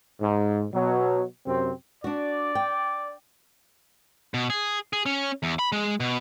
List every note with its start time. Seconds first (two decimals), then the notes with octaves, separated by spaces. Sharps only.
0.21 G#2
0.73 B2 F#3
1.47 F#2 C3 C4
2.04 D4 F#4 D5
2.55 G5
4.34 B2
4.50 G#4
4.93 G#4
5.06 C#4
5.43 E2
5.59 B5
5.72 G#3
6.00 B2